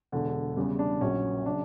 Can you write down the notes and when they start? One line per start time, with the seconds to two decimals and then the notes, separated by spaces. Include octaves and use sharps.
0.12 E1 E2 D3
0.57 E2 C#3 G3
0.79 D4
1.01 A#1 A#2 F#3 C#4
1.46 C#3 F#3 D4